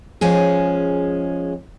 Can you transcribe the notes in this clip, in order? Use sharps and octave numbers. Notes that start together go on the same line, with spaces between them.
F3 G#3 C#4 G#4